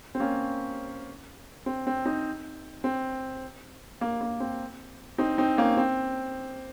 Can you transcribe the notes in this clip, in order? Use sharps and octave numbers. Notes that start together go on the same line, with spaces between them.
C4
A#3 C#4
C4
C4
C4 D#4
C4
A#3
A#3
C4
C4 D#4
C4 D#4
A#3 C#4
C4